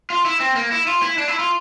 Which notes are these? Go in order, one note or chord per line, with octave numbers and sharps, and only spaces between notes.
F4
E4
C4
A#3
E4
F4
E4
D4
E4
F4